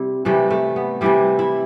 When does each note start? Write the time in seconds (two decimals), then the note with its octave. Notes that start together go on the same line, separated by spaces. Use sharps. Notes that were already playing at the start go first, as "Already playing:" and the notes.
Already playing: C3 G3 C4 E4
0.25 C3 E3 G3 A3
0.50 A3
0.76 B3
1.01 C3 E3 G3 E4
1.39 E4